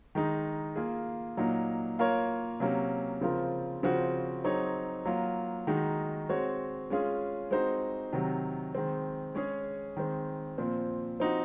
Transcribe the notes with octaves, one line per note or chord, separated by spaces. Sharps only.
D#3 G#3 D#4
A#3 F4 G#4
A#2 F#3 A#3 D#4
A#3 F4 A#4 C#5
C3 F#3 A#3 C#4
C#3 F3 C4 F4 A#4
C#3 F3 C4 F#4
F#3 C4 D#4 G#4 C#5
F#3 A#3 F4
D#3 G#3 D#4 F#4
G#3 C4 F#4 C#5
G#3 C#4 F4 G#4
G#3 C4 D#4 F#4 C5
C3 D#3 F#3
D#3 G#3 C4
G#3 C#4 G#4 C#5
D#3 G#3 C4
A#2 F3 C4
F3 C4 D#4 F#4